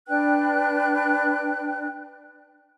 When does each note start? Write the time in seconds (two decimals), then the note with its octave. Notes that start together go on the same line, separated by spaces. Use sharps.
0.07 D4 B4 G5 F#6